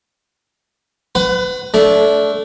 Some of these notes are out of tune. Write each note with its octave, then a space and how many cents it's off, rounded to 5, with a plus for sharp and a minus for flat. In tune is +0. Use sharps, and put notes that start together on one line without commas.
B4 +35 F#5 +0 B5 +30
A3 -10 D4 -25